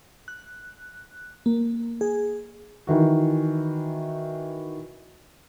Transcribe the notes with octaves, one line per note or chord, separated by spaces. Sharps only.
F#6
A#3
G#4
D#3 E3 F#4